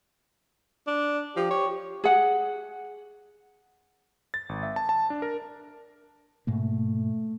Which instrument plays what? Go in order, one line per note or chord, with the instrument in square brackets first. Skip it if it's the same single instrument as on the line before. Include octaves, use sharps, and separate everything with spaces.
[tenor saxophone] D4
[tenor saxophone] F3 [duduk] G4
[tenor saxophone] C#5
[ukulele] G#4 F#5
[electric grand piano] A6
G#1
E5
A5
A5
D4
A#4
[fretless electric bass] G#2 B2 A#3 [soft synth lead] A3